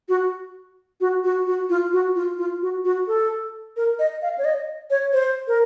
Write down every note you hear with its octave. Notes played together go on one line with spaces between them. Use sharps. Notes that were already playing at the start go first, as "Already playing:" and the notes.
F#4
F#4
F#4
F#4
F4
F#4
F4
F4
F#4
F#4
A4
A#4
D#5
F5
C#5
D#5
C#5
C5
A#4